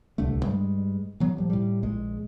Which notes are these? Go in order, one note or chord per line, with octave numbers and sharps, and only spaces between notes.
D1 C2 D3 A3
G2 G3 G#3
E3 F#3 B3
A2 F3 G3
A2 G3
A#1 G#3